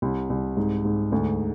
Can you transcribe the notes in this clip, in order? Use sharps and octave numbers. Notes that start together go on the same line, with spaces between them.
C2
C2
G#2
G#2
D2